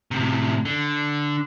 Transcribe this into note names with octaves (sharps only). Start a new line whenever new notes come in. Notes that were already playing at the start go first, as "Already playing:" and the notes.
A2 C3
D3